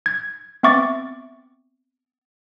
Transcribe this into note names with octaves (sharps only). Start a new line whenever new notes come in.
G#6
B3 C4 E5 C#6 D6 A6